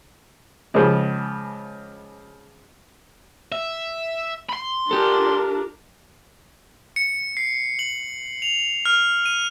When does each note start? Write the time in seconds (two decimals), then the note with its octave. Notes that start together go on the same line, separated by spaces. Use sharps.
0.74 C#2 C#3 F3
3.52 E5
4.50 B5 C6
4.91 D4 F4 G4 A4 A#4
6.96 C#7
7.37 C7
7.79 F#7
8.42 F7
8.85 F6
9.26 D#7